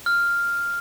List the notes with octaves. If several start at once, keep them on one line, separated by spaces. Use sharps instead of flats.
F6